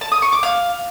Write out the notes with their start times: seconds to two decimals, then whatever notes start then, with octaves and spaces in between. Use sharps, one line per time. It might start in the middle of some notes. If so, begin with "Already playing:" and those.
0.01 A5
0.12 D#6
0.22 C#6
0.32 D6
0.43 F5